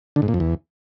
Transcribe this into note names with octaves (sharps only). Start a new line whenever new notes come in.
D3
G#2
A#2
F2
E2